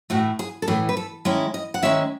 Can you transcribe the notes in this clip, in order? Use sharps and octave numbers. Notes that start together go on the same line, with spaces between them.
A2 E3 A3 F#4
G#4
A4
A2 E3 A3 G#4
B4
A4
D#3 G#3 C#4 E4
D#5
F#5
D#3 G#3 C#4 E4 E5